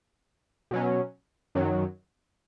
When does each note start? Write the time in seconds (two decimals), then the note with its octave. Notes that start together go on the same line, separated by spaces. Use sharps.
0.71 B2 F#3 C#4
1.55 F#2 D#3 F#3